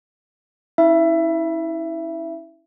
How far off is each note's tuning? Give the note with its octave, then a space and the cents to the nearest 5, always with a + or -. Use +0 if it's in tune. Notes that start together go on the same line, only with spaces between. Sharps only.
C#4 +0 E4 -30 E5 +20